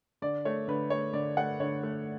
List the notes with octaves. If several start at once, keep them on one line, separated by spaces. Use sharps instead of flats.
D3 D5
A3 C#5
D3 B4
A3 C#5
D3 D5
A3 F#5
D3 C#5
A3